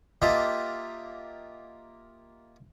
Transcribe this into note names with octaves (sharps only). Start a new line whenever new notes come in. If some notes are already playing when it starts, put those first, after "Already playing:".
A#3 F4 G4 D#5 E5 A5